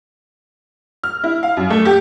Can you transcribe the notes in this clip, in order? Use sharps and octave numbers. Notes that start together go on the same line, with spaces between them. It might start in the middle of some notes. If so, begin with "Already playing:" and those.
F6
E4
F5
F#2
A3
G4